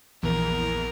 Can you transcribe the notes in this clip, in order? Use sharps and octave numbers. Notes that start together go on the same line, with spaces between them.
A#1 E2 A#4